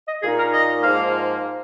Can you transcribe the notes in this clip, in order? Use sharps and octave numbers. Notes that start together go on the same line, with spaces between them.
D#5
A#2 A#3 D#4 G#4
A#4
D#5
G#2 F3 A#3 F5